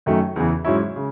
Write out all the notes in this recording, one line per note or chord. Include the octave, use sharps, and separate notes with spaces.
F#2 D#3 F#3 A3
E2 C#3 E3
G#2 F#3 C#4 E4
C#3